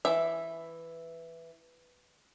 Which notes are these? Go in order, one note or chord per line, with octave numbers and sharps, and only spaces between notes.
E3 E5